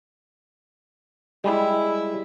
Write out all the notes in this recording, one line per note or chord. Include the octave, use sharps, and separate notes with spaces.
G3 G#3 E4